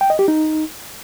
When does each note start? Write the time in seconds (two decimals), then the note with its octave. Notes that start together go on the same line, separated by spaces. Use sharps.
0.01 G5
0.10 D#5
0.19 G4
0.28 D#4